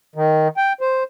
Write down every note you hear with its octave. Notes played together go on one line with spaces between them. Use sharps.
D#3
G5
C5